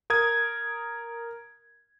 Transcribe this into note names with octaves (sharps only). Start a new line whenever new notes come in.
A#4 D#6 G#6